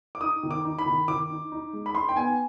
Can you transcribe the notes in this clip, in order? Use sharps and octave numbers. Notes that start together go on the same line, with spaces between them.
D6
D#4 D#6
D#3
D6
D#4
B5
D#3
D#3 D6
D#4
D#4
G#3
B5
D#4 C6
G5
B3 G#5